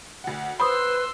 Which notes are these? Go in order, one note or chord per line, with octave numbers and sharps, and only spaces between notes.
D2 F#5
B4 C5 B5 C6 D#6 E6